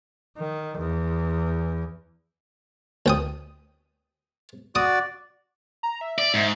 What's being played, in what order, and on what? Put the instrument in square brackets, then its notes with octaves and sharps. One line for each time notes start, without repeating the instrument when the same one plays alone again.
[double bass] D#3
E2
[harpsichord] D2 G5 D#6
[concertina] F#4 D5 [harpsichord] D6 D#6
[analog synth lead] A#5
E5
[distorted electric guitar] D5
G#2